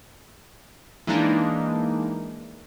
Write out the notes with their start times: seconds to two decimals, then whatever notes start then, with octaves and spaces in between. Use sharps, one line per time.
1.07 E3 G#3 A#3 D4 D#4